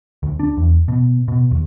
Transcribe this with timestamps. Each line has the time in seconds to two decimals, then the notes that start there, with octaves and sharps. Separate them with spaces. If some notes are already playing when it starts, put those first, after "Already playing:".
0.23 D2
0.39 D4
0.57 E2
0.88 B2
1.28 B2
1.51 D#2